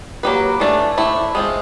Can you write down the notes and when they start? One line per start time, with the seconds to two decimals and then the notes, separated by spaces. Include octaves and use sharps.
0.23 F#3 A#3 D#4 G4 B4
0.60 E3 A3 D4
0.98 A3 C4 E4
1.35 G#3 C4 F4